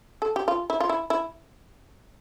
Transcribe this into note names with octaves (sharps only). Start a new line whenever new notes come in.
A4
G4
F4
E4
F4
E4
E4